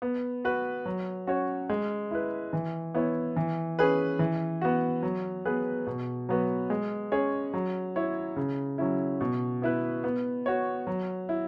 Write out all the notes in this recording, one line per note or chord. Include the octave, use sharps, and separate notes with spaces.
B3
F#4 B4
F#3
C#4 F#4 C#5
G#3
E4 B4
E3
B3 E4 C#5
E3
C#4 G#4 B4
E3
B3 F#4
F#3
B3 G#4 B4
B2
F#3 B3 F#4 B4
G#3
C#4 G#4 C#5
F#3
E4 C#5
C#3
F#3 C#4 E4
B2
B3 E4 B4
B3
F#4 C#5
F#3
E4